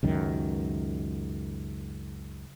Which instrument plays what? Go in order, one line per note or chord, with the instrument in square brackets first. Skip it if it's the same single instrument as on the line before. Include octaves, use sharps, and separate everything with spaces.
[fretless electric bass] C#2 F#2 D#3